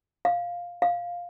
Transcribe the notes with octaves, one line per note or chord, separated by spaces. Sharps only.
F5
F5